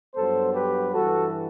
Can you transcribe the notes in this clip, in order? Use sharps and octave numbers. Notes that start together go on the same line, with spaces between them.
G2 F#3 B3 A4 C5
G4 B4
G2 E3 G3 F#4 A4